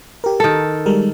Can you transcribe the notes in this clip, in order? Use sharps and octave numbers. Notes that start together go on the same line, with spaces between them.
G4 A#4
D#3 A4
G3 G#3 A#4